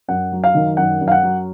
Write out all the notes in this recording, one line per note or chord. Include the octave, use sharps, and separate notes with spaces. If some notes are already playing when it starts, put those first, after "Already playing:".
F#2 F#5
F#3
F5
D#3
F#2 F#5
F#2
F5
F#5
F#3